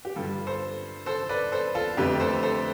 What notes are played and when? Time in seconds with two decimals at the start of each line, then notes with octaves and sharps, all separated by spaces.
0.05 G4
0.16 G2 D3 G3 F4 A4
0.47 A4 C5
1.06 A4 C5
1.29 B4 D5
1.52 A4 C5
1.75 F4 A4
1.97 F2 D3 A3 G4 B4
2.20 A4 C5
2.43 A4 C5